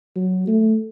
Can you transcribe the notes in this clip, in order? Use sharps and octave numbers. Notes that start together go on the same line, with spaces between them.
F#3
A3